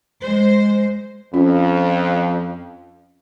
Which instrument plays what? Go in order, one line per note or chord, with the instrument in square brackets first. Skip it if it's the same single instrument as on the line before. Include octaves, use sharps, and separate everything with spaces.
[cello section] G#3 C5
[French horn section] F2 [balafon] C#4 F4